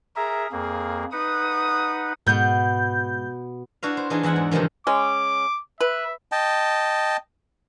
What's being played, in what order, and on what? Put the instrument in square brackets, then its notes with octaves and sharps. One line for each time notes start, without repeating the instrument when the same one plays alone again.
[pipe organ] G#4 A#4 E5 [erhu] A#5
[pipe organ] F2 A#3 [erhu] G#4
[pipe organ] D#4 B4 F#5 [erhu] D#6
[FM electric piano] G#2 G6 [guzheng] B2 B3
[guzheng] D4 E4 F#4 B4 F5
C5
E3 D4 D#4 F4 F#4 G#4
E2 E3 G#3 E4 F#5
G#2
E2 G2 C3 D#3 F3
[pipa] G#3 C#4 [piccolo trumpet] D6
[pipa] B4 [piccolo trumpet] E5
[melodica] D#5 G5 A5